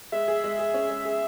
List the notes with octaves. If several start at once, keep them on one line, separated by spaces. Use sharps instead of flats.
G#3 E5
G#4
G#3
G#4
C#4
G#3
G#4